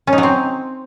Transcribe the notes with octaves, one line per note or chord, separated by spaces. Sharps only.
C#4
D#4
F#3
C4